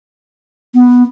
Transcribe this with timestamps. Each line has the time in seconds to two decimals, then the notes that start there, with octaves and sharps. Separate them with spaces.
0.74 B3